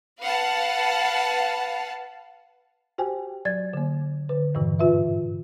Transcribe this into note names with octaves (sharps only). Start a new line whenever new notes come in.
B4 F5 F#5 A5
F#4 G4 C5 G5 G#5
F#3 D5 G#6 A6
D3 A#3
D3 B4
E2 G2 A#2 C#3 E3
G#2 F4 B4 E5